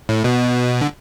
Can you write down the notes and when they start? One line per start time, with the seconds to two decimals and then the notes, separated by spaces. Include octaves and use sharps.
0.09 A2
0.24 B2
0.81 D3